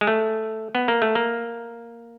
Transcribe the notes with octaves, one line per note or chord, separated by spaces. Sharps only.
G#3
A3
B3
A#3
A3
A#3